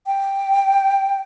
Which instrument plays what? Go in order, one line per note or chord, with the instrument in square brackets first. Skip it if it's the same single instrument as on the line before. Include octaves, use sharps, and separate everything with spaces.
[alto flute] G5